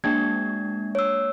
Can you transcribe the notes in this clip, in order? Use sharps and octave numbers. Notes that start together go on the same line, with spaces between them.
G#3 A#3 D4 G#6
C#5 E6